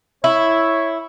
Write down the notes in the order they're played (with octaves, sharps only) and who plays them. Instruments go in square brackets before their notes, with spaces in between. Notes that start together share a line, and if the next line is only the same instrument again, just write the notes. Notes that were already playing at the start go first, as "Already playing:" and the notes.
[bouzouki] E4 [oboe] C#5